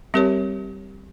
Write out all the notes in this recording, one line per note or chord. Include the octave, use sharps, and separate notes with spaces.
G3 C4 G4 A#4 C#5